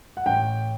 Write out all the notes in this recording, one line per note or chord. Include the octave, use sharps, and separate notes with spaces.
F#5
A1 G5